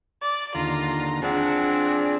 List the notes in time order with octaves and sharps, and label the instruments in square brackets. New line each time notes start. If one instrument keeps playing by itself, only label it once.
[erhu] D5
[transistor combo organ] D#2 D3 A#5 [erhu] F4
[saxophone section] F3 C4 D4 [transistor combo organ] G#4 [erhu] F#5